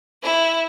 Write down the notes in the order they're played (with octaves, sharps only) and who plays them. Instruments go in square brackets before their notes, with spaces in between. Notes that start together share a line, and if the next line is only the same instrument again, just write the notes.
[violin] E4